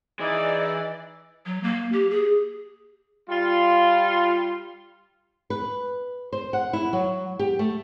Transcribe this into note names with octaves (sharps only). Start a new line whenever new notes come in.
E3 D#4 E4 G#4 D5 D#5
F#3
A#3
G4
G#4
G3 F4
B4
C5
F#5
E4
F#3
G4
A3